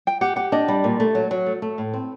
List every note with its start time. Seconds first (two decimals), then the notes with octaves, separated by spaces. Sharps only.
0.07 G5
0.21 G4 F#5
0.36 G4 F#5
0.52 D4 D#5
0.68 G3
0.84 A#2
1.00 A3
1.15 F#3
1.31 F#3
1.46 A3
1.62 A3
1.78 A2
1.94 C4